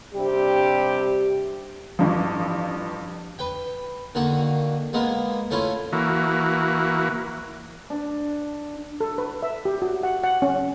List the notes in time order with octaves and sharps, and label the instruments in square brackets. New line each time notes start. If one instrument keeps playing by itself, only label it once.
[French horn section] C3 G3 C4 D4 G4
[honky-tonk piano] A1 G2 F3
[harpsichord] B4 G5
D3 D#3 A#3 F#4
G#3 A#3 B3 A#4
A3 C#4 E4 F4
[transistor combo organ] E3 A#3 F#4
[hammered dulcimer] D4
[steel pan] A4
B4
E5
G4
F#4
F#5
F#5
C#4